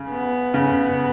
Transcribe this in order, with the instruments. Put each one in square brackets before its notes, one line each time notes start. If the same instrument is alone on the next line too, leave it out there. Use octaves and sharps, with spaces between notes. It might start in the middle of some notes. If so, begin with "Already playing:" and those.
Already playing: [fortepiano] C#3
[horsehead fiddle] B3
[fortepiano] C#3